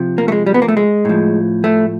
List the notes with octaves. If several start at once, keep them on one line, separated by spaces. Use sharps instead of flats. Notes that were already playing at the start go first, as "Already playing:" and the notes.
Already playing: C3 F3
A#3
A3
G#3
G3
B3
A#3
A3
G#3
A2 F3
A3